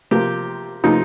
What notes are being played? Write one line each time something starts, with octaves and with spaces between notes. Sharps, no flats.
C3 F3 A#3 G4
C3 F3 A#3 D#4